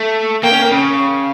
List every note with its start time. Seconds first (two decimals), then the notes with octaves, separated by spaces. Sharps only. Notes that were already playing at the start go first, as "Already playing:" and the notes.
Already playing: A3
0.43 A#3 G5
0.53 C#4
0.62 A#3
0.72 C#3